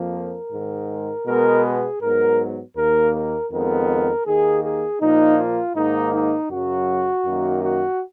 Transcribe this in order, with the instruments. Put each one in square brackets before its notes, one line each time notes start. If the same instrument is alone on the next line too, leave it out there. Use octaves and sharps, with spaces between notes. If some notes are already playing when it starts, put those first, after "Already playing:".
Already playing: [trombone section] F2 F3 A#3
A#4
G#2 D#3 G#3
B2 G#3 B3 A#4
G#4
G#2 F#3 B3 A#4
D#2 D#3 A#3 A#4
A#4
F2 D#3 G#3 B3 A#4
D#2 D#3 A#3 G#4
G#4
A#2 F3 A#3 D#4
F4
G#2 D#3 A#3 D#4
D#4
F#2 C#3 F#3 F#4
F#2 D#3 A#3
F#4